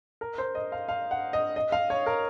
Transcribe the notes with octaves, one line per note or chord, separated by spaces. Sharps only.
A#4
C5
D#5
F5
F5
F#5
D#5
D#5
F5
C#5
A#4